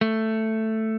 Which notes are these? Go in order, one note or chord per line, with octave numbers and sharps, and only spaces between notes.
A3